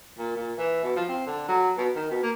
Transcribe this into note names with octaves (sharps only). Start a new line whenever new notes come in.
A#2
A#2
E3
B2
F3
C4
D3
F#3
B2
D#3
B2
A#3